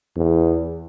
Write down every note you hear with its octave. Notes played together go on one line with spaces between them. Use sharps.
E2